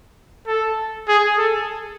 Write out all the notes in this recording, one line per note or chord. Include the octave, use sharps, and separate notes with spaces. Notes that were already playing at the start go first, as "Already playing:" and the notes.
A4
G#4
A4